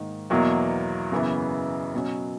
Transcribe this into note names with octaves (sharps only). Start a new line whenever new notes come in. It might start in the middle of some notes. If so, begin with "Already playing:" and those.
Already playing: G#2 D#3 A#3
E2 B2 F#3 A#3 E4
F#2 C#3 E3 B3 E4
B2 F#3 C#4